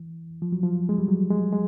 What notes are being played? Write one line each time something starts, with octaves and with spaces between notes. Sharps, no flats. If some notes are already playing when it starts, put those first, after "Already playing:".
Already playing: E3
F3
F#3
F3
G#3
G3
F#3
G#3
G#3